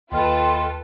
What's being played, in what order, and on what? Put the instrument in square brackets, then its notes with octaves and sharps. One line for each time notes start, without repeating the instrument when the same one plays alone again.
[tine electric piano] D#2 D#5 F6 [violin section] F4 A4 B4 [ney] G5 [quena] C6